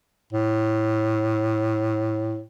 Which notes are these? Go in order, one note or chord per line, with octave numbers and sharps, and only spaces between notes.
A2